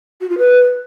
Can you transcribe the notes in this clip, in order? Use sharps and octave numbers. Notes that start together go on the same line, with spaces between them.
F#4
F4
B4